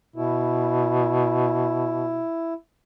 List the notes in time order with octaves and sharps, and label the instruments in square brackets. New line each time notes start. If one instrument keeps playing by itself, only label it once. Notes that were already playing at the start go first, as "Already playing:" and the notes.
[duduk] B2 [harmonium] E4